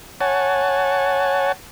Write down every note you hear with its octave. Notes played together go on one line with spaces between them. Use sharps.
C#5 F#5 G#5 A5